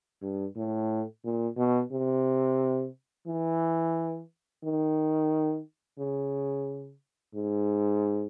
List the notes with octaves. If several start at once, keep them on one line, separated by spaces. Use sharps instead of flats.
G2
A2
A#2
B2
C3
E3
D#3
C#3
G#2